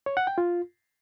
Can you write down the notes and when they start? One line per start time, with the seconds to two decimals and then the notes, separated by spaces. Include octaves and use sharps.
0.06 C#5
0.17 F#5
0.27 G5
0.38 F4